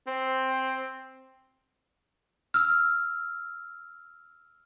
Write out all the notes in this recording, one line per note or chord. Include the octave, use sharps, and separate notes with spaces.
C4
E6 F6